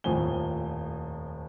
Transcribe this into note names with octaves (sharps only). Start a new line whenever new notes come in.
D#1 F2 A2 F3 G#5 G7